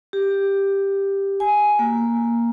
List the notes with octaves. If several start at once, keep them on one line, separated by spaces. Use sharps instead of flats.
G4
G#5
A#3